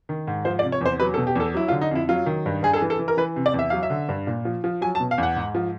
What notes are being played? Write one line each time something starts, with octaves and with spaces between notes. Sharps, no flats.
D#3
G#2
F3 C5
D5
C3
C#5
E2 C5
F#3 B4
A4
B2
G4
E2 A4
F#3 E4
F4
D3
D#4
F2 E4
F#3 F4
D#3
G2
G2 G#4
A4
G#4
E3
A4
E3
A#4
E3 B4
C3
D5
E2
E5
F#3 F5
E5
D3
G2
A#2
F3
F3
F#3 G#5
A5
B2
F5
E2 F#5
G#2
F3